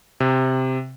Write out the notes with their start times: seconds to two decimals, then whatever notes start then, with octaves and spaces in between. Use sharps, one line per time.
0.20 C3